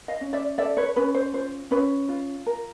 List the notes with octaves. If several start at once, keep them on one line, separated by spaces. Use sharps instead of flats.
D#5 F5
C#4
D5 E5
A4 D5 E5
B4 C#5
C#4 B4
C5
F4 C5
C#4 B4
F4
A#4